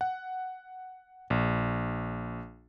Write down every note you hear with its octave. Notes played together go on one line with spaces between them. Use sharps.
F#5
A#1